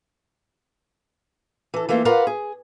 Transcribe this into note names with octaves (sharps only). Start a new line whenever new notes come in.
E3 A4
E3 A3 A#3 F4
F4 A#4 B4 D5 F5 F#5
G#4